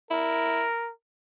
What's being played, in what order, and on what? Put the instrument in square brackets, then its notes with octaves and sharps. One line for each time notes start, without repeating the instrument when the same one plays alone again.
[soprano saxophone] E4 [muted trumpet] A#4